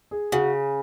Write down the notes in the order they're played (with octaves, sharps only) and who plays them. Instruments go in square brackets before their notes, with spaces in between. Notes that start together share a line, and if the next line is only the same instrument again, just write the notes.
[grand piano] G#4
[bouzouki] C#3 [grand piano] F#4